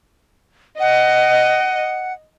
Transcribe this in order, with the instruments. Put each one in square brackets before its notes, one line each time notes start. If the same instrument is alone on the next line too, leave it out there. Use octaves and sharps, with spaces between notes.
[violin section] D#5 [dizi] F#5